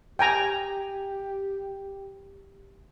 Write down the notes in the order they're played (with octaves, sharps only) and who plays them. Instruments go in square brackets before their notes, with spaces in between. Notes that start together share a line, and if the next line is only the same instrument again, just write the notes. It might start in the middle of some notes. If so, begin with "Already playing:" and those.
[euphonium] G4 [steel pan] G5 G#5 A#5